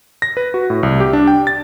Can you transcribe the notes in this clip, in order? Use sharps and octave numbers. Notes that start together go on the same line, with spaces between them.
A#6
B4
F#4
A2
C2
G4
D4
G5
A6